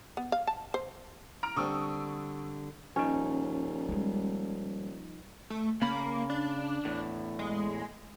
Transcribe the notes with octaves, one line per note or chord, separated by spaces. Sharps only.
B3
F5
A5
C5
A#5 F6 D7
D3 G3 C4 C#6 D#6 E6
D#1 F3 C#4 D#4
G3 G#3
A3
C#3 A#3 B5
D4
E2 A2
G#3